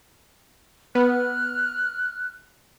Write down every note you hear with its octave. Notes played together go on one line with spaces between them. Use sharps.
B3 F6 F#6